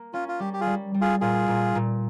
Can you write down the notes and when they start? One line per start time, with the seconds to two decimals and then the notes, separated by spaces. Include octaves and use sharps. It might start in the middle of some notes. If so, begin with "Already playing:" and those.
Already playing: A#3
0.13 C#4 F4
0.28 F4
0.40 G3 G4
0.53 G4
0.60 F4 G#4
0.67 G3
0.94 G3
1.01 F4 G#4
1.21 A#2 F4 G#4
1.48 A#2
1.75 A#2